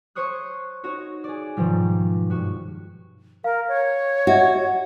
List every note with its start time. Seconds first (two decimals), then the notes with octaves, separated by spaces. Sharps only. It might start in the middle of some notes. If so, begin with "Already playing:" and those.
0.15 C5 C#5 C#6 D#6 F#6
0.84 D#4 F#4 C#5
1.24 G#4 D5
1.57 G#2 B2 D#3 F3 G3
2.30 G2 F#4
3.44 A#4 F5
3.68 C#5
4.27 F#4 D#5 E5 F#5